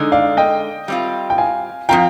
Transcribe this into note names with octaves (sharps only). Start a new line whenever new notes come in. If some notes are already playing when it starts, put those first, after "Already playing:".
Already playing: D3 G#3 D#4
D5 F5
D#5 G5
G3 C4 F4
G5
F5 G#5
F3 C4 F4 G5 A#5